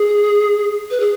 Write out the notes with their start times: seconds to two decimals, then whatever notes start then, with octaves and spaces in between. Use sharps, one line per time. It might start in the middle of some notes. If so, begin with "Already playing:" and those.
Already playing: G#4
0.91 B4
1.00 G#4